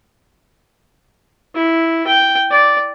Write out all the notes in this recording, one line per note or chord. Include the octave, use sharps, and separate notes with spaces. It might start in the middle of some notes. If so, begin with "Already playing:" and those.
E4
G5
D5